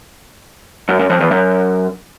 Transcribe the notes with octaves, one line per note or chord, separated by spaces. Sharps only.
F#2
F#2
F2
E2
F#2